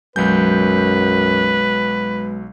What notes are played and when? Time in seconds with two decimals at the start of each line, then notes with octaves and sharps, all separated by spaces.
0.16 B1 F#2 F#3 G#3 B4 G6